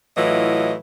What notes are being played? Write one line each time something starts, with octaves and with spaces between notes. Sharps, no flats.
A2 E3 F#3 F4 D#5